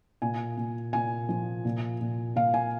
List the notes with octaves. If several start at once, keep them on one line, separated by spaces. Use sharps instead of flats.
A#2 G#5
A#2
A#2 G#5
F3
A#2
A#2
A#2 F5
G#5